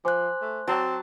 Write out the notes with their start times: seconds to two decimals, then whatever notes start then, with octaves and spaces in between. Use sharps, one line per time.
0.05 F3 C5 G#5 C6 D6 F#6
0.42 A3
0.68 F#3 C4 A5 E6